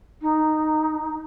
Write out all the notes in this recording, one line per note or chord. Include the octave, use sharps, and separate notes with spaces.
D#4